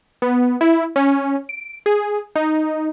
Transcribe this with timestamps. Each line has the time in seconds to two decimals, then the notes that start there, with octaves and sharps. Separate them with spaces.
0.22 B3
0.61 E4
0.96 C#4
1.49 D7
1.86 G#4
2.35 D#4